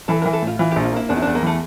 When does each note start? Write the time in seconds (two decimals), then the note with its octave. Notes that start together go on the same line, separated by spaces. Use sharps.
0.08 E3 A4
0.22 E3 A#4
0.33 A4
0.42 A2 F4
0.59 E3 F4
0.71 G4
0.76 A#1
0.84 F4
0.92 A#3 E4
1.09 E2 D4
1.16 E4
1.22 D4
1.27 E2
1.35 A#3
1.43 E3 A3